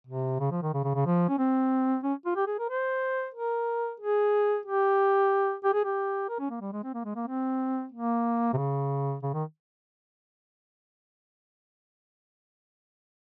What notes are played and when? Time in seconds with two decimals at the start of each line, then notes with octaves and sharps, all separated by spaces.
0.07 C3
0.40 C#3
0.52 F3
0.63 D#3
0.74 C#3
0.84 C#3
0.95 C#3
1.06 F3
1.29 C#4
1.39 C4
2.03 C#4
2.26 F4
2.36 G4
2.47 G#4
2.59 A#4
2.69 C5
3.34 A#4
4.00 G#4
4.65 G4
5.64 G4
5.74 G#4
5.85 G4
6.29 A#4
6.39 C#4
6.50 A#3
6.61 G3
6.72 G#3
6.84 C4
6.94 A#3
7.05 G#3
7.15 A#3
7.27 C4
7.92 A#3
8.53 C3
8.57 C#3
9.23 C#3
9.34 D#3